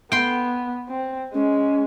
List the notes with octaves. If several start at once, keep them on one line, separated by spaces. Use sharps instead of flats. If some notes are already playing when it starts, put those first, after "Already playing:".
B3 G5 C6
C4
G#3 C#4